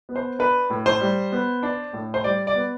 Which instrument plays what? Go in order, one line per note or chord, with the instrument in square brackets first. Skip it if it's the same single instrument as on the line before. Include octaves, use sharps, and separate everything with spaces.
[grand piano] B3
C5
D4 B4
A2
C5
G3
B3
D4
A2
C5
G3 D5
D5
B3